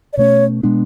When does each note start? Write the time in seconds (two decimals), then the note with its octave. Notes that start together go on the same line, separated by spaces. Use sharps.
0.13 D5
0.17 B2 A3 C#4 C#5
0.63 B2 G#3 B3 D4